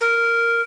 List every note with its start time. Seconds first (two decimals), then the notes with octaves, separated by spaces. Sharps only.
0.01 A#4